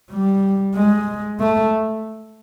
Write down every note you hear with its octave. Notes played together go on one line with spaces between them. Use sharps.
G3
G#3
A3